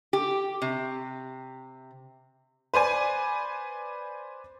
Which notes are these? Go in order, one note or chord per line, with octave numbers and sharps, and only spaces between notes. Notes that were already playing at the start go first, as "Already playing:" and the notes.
G4
C3
B4 C5 D5 G#5